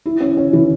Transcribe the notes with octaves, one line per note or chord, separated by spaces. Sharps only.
E4
C#4
C#4
E3